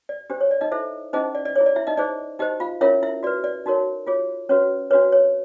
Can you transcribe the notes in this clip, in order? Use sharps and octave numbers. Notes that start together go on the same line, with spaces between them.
D5
D4 G4 C5
C#5
D5
D#4 D#5
E4 A4 C5 E5
C#4 D#4 E4 G#4 C5 D#5
D5
D5
E4 G#4 C#5
D5
E4 E5
D#4 D#5
D#4 G#4 C5 D5
D#4 G4 C5 D#5
F4 F5
C#4 E4 F4 A#4 C#5 E5
E4 E5
F#4 B4 D5
D5
D#4 F#4 A#4 C#5
F4 G#4 C#5
C#4 F#4 B4 C#5
D4 F#4 B4 C#5
C#5